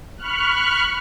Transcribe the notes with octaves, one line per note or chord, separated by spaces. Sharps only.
B5 C#6 F6 F#6